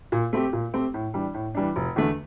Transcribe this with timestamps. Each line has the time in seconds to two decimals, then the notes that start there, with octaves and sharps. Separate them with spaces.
0.12 A#2
0.33 A3 C4 G4
0.53 A#2
0.74 A3 C4 G4
0.94 A2
1.14 E3 G3 D4
1.34 A2
1.55 E3 G3 D4
1.76 F1
1.96 E2 D3 A3